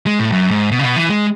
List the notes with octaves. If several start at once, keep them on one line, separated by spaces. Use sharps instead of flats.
G#3
A2
F#2
G#2
B2
C#3
B2
E3
G#3